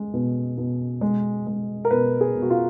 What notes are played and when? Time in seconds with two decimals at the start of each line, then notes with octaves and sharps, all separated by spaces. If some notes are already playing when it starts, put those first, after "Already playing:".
Already playing: G#3
0.14 B2
0.58 B2
1.01 G#3
1.47 G#3
1.85 A#4
1.91 B2 B4
2.21 G#4
2.35 B2
2.42 F#4
2.50 F4